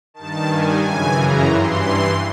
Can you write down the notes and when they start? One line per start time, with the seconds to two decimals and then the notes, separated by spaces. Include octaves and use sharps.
0.14 G2 D#3 A5
0.47 G#5
0.80 F#2 C#3 E3 G#5
1.13 A#5
1.45 G2 E3 C6